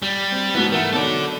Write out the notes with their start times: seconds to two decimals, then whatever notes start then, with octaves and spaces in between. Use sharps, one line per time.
0.02 G3
0.32 C4
0.55 G#2 B2 E3 B3
0.72 A3 A#4 F#5
0.93 B2 F#3 D#4 A4 D5